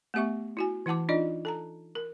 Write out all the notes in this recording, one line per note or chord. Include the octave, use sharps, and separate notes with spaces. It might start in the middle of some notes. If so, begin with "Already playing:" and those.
A3 B3 G4 E5 C#6
E4 F#4 G#5
E3 E4 F#5 A5 D6
D4 D#4 F4 D5 D#5
A4 A5 A#5
A#4